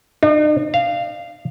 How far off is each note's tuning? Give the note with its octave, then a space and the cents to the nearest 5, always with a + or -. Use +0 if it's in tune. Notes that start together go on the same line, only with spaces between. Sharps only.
D#4 -45
F5 -10